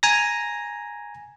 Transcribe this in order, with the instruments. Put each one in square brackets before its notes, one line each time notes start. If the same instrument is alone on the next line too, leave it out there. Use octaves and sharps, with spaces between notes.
[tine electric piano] G#5 A#5 A#6